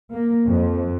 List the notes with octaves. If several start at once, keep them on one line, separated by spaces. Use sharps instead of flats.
A#3
F2